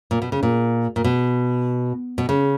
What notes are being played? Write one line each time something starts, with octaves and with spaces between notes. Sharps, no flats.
A#2
B2
C#3
A#2
A#2
B2
B2
C#3